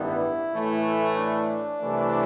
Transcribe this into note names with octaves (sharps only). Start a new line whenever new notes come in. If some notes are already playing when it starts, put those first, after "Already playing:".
Already playing: A1 G2 D#3 G3 B3 E4
A2 E3 A3
D4
C2 C3 E3 A3